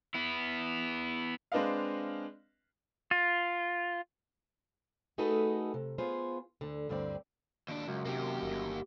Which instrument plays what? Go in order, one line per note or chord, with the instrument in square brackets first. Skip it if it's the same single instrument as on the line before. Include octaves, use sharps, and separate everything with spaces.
[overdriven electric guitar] B3 E4
[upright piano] G#3 C4 D4 B4 D#5 F5
[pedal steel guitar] F4
[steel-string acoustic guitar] A3 D#4 F#4 G#4 A4 B4
C3
B3 F4 G#4 C5
D2 D3
D2 G2 D3 C4 D5
[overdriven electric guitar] D#2 D4
[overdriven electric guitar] C#2 [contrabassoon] F#2
[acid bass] C3 [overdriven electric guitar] A#3 G4
[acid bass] G1